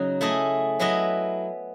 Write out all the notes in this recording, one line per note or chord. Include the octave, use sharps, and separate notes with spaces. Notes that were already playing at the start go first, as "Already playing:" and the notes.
Already playing: C#3 F#3 D#4 F#4
A3 E4 G#4 D#5
F#3 B3 E4 B4 D#5